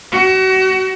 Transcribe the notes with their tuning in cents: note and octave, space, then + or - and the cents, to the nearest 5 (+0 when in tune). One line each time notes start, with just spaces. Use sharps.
F#4 +35